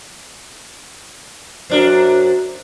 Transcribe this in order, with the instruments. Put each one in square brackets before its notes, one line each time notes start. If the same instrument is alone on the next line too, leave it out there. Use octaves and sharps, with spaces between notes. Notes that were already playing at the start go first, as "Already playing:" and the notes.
[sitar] F#2 D4 A#4 [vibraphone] F#4 C5